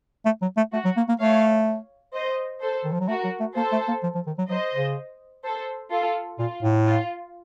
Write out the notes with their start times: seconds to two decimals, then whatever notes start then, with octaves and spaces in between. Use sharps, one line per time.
0.25 A3
0.42 F#3
0.57 A3
0.73 A3 F#4
0.85 F#3
0.97 A#3
1.08 A#3
1.20 A3 C#5 F5
2.14 C5 D#5
2.61 A4 C5
2.84 D#3
2.92 F3
3.00 F#3
3.08 A3 F#4 A#4
3.24 F#3
3.40 A3
3.55 A#3 A4 C5
3.72 A3
3.88 A#3
4.03 F3
4.15 F3
4.27 D#3
4.38 F#3
4.50 F#3 C5 D#5
4.74 C#3
5.44 A4 C5
5.92 F4 A4
6.39 A#2 F4
6.63 A2
6.87 F4